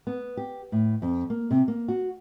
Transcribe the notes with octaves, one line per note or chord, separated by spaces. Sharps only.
B3
G4
A2
F2
A#3
C3
A#3
F#4